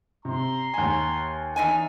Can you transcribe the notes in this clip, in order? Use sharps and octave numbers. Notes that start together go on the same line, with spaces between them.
C3 A#5 C6
D#2 G#5
E2 D#4 G#5